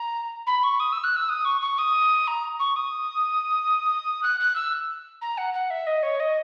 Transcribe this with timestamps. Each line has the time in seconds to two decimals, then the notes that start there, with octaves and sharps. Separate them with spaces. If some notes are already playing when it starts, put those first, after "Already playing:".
Already playing: A#5
0.47 B5
0.63 C#6
0.80 D#6
0.92 E6
1.04 F#6
1.16 E6
1.29 D#6
1.45 C#6
1.62 C#6
1.78 D#6
2.28 A#5
2.60 C#6
2.76 D#6
4.23 F#6
4.40 F#6
4.55 E6
5.22 A#5
5.38 F#5
5.54 F#5
5.70 E5
5.87 D#5
6.03 C#5
6.20 D#5